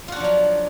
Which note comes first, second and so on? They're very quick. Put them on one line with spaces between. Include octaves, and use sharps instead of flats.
F4 F#4 D4 F3 F#3